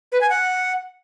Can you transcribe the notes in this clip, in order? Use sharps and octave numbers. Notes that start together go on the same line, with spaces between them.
B4
G#5
F#5